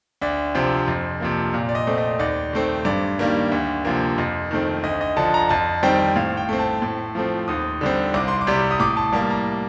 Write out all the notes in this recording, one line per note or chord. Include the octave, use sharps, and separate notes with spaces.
D2 D5
C3 F3 C4
F2
C3 F3 A#3
A#2
D5
D#5
A3 C4
D#5
D#2 D5
D#3 A3 C4
G2 D5
D#3 G3 A#3
D2
C3 F3 A#3
F2
D#3 A3 C4
D2 D#5
D#5
D3 F3 A5
A#5
F2 A5
D#3 G3 C4 G5
A2 F5
G5
A3 C4
A5
A2
F3 A3 C4
D#2 D#6
D3 G3 C4
C2 D6
C6
D6
C3 G3
D#6
A2 D6
A5
G3 A#3 A5
A#5